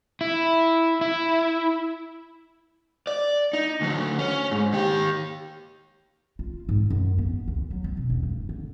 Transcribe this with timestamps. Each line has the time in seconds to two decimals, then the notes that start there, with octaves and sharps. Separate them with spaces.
0.21 E4
1.01 E4
3.07 D5
3.53 D#4
3.81 D2 F#3
4.19 C#4
4.51 G#2
4.72 D#3 G4
6.39 F4
6.69 G#2
6.90 F#2
7.18 B3
7.48 D2
7.71 F#3
7.84 C4
7.97 B2
8.10 E1
8.23 G2
8.49 D3